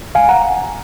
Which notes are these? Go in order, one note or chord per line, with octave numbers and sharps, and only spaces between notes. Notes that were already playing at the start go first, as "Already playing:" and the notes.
C#2 F5 G#5
F#5 A#5